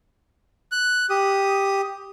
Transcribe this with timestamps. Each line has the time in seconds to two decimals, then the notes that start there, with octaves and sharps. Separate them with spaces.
0.72 F#6
1.10 G4 D#6